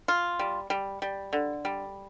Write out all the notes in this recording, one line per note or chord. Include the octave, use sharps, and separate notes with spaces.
F4
G3
G3
G3
D3
G3